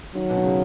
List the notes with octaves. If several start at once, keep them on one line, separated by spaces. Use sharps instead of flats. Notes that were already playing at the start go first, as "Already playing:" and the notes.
D#3 F#3
B2
D#3
C#3